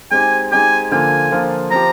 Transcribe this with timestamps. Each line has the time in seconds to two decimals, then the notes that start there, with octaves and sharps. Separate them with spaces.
0.11 G#3 C4 D#4 G4 G#5
0.51 G#3 C4 D#4 G4 G#5
0.92 D3 F3 A#3 F4 G#5
1.32 D3 F3 A#3 F4
1.71 F3 C4 G4 A#5